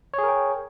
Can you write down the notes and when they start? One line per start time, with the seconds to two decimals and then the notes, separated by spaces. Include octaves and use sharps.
0.14 C#5
0.18 G#4
0.23 A#4
0.28 G5